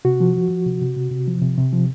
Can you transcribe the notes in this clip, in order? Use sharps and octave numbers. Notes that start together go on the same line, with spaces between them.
C3 F#4
F3
F3
F3
C3
C3
C3
C3
F3
C3
C3
F3